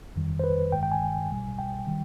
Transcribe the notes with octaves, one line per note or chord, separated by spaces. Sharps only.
F2 D#3 G3
C5
B4
G1 G2 D#3 G#3 G5
G5
G#5
B1 B2 G3
G5
D#3 G3